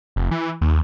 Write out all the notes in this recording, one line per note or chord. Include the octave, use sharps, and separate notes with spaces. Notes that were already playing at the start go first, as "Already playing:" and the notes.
F1
E3
D#2